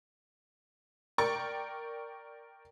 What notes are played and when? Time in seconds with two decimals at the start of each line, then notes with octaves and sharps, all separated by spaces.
1.18 A#4 D5 G5 C#6 A6